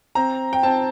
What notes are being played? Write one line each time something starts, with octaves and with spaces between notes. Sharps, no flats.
C4 A#5
G5
C4 A5